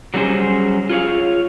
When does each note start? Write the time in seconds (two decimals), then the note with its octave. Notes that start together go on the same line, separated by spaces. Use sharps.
0.14 F#3 G3 A3 C#4 G#4 C5
0.90 F4 G#4 C#5 F5